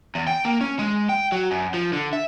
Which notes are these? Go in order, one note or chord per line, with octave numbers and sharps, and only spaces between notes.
E2
G5
A#3
C#4
G#3
G5
F#3
F#2
F3
D3
E5